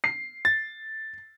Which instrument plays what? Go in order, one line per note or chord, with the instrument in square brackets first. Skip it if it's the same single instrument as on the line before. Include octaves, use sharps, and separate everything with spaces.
[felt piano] C7
[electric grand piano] A6